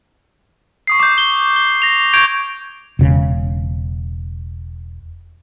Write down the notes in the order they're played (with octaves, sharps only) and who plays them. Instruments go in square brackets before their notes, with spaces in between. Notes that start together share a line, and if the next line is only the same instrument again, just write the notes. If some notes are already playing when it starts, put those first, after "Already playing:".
[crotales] C#6 D#6 C7
D6 G6
G7
G7
A#6 F7
C#6 G6 G#6 D7 F7
[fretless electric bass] E1 C#3